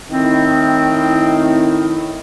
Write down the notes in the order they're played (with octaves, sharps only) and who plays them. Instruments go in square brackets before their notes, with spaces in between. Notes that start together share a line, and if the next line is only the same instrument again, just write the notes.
[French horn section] A2 D#3 E4 [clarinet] C4